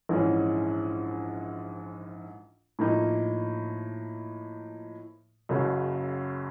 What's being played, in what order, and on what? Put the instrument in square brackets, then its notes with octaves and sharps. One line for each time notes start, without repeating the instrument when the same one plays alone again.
[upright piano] A#1 G#2 E3 G#3 C#4
A2 F3 A#3 D#4
F#1 F#2 C#3 F#3